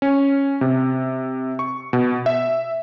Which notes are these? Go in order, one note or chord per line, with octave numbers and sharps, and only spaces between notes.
C#4
C3
C#6
B2
E5